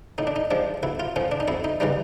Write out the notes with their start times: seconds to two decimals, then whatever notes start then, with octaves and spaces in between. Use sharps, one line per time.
0.18 A2 D#4
0.27 D4
0.36 D#4
0.51 F3 G#3 D4
0.83 B1 E4
1.00 F4
1.16 A2 F3 C#4
1.32 D4
1.40 D#4
1.48 F2 E4
1.64 D#4
1.80 C#3 E3 G3 D#4